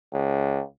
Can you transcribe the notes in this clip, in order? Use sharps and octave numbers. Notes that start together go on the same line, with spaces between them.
C#2